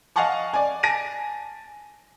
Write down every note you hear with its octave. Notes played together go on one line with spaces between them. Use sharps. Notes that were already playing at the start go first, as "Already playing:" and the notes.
D#5 F5 F#5 G#5 A5 C#6
D5 G#5
G#5 A5 A#6 D7 D#7